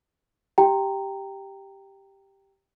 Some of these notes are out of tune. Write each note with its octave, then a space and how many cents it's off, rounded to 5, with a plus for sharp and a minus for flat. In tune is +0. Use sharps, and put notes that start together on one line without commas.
G4 +0 G5 +0 A#5 -15